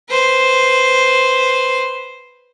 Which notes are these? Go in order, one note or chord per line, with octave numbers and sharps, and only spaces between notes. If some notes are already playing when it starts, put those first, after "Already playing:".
B4 C5